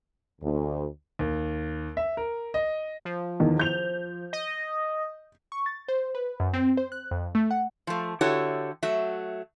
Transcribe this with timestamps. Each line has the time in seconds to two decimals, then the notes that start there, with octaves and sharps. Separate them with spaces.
0.42 D2
1.19 D#2
1.97 E5
2.17 A#4
2.54 D#5
3.05 F3
3.40 E2 D#3
3.59 G6 F7
4.33 D#5
5.52 C#6
5.66 A6
5.88 C5
6.15 B4
6.40 F#2
6.53 C4
6.77 C5
6.92 F#6
7.11 F2
7.35 A3
7.51 F#5
7.87 F3 A3
8.21 D3 E4 F#4 G4 A4 C#5
8.83 F#3 A3 F#4 E5